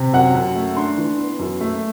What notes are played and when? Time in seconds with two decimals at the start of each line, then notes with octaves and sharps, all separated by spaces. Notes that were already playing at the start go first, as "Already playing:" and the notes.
Already playing: C3
0.13 F#2 F#5
0.35 F#2
0.55 A3
0.76 D4 C6
0.98 E3
1.19 B3
1.39 F#2
1.61 A3